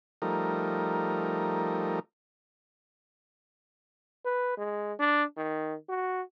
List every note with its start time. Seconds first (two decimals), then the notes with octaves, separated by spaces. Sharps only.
0.22 F3 G3 A3 D#4 A#4
4.25 B4
4.58 G#3
4.99 D4
5.37 D#3
5.89 F#4